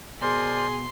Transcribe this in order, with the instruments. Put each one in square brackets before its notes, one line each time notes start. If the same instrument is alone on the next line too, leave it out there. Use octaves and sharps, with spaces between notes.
[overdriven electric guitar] B2 [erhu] G#4 [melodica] A#4 C5 D5 [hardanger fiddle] C6